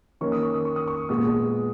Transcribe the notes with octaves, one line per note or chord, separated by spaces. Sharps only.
D#3 A#3 C#4 C#6
D#6
C#6
D#6
C#6
D#6
C#6
A#2 G#3 B3 D#6